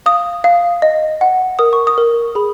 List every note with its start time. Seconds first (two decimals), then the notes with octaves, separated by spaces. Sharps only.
0.06 F5 D#6
0.44 F5
0.82 D#5
1.21 F#5
1.59 A#4 D#6
1.73 C#6
1.87 D#6
1.98 A#4
2.35 G#4 B5